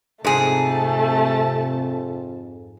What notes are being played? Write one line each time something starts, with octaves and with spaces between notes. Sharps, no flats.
F2 G#2 C3 A3 G#4 A5